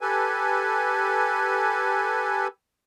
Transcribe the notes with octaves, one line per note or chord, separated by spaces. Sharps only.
G4 A4 B4 G#5